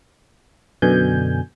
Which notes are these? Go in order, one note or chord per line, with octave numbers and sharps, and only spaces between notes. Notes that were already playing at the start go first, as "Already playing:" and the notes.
F#2 B2 D3 G#5 G6